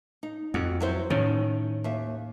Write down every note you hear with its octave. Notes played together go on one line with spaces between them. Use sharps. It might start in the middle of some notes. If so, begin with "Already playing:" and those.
D#4
F2 F#4
F#3 E4 C5
A2 D#3 C#4
D#2 E5